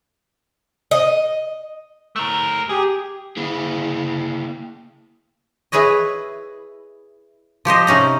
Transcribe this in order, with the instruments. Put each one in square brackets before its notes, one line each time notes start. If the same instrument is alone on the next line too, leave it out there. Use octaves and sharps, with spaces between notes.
[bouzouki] D#5
[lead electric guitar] A3 A#4
[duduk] G4 [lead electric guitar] G#4
[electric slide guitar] A#3 E4 G#4
[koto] E4 G#4 B4 C#5 D#5
F3 G4 C5 D#5
C3 C#4 D#4 A#5